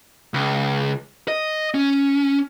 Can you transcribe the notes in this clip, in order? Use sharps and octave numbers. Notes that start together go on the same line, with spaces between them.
C#2
D#5
C#4